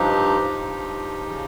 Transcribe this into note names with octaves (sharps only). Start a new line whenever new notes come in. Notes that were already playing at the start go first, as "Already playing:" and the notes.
Already playing: G2 F3 D#4 G4
G2 F3
C#3 F3